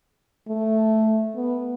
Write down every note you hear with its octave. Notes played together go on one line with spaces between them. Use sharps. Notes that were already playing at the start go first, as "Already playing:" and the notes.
A3
B3